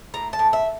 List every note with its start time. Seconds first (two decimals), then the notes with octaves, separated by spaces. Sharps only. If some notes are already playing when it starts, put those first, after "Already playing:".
0.14 A2 A#5
0.33 A5
0.39 A2
0.53 E5